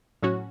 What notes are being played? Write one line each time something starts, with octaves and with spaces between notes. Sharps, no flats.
A2 F#3 C#4 F#4